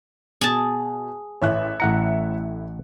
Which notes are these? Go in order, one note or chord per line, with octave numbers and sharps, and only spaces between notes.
B2 G#4 A5
A1 A2 C#5 E5 F#6
A1 A2 E4 F#5 A#5 C#7